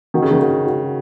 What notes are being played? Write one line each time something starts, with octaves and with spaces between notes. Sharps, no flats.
D#3 F#4
C#3
D#3
F#4
F#4